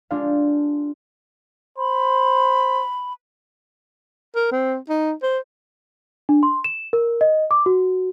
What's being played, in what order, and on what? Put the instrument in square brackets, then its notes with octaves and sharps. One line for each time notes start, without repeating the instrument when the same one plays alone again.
[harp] G#3 D4 F4 G4 A4 F5
[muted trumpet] C5 [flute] B5
[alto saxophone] A#4
C4
D#4
C5
[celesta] D4
C6
E7
A#4
D#5
D6
F#4